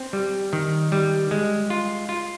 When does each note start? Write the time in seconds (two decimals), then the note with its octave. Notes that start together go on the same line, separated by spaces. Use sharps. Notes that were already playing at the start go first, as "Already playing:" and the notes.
Already playing: C4
0.13 G3
0.53 D#3
0.92 G3
1.31 G#3
1.70 F4
2.09 F4